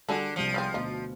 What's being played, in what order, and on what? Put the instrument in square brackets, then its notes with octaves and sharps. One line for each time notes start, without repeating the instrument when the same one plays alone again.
[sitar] D3 [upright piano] G3 [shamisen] F#4 G#4 A4
[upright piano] C2 G3 C#7 [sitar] F3
[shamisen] C#3 B3 C4
[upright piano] D2 B2 [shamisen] D#4 F4